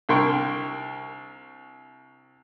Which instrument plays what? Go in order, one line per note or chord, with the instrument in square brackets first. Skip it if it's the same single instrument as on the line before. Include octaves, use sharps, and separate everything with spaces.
[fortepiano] C2 D3 A#4 G5 C6 C#6